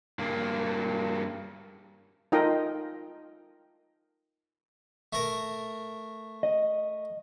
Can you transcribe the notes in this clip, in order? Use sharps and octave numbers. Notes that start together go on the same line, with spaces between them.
G2 A#3
D#4 F4 A4 A#4 D#5 G5
A3 A#4
D#5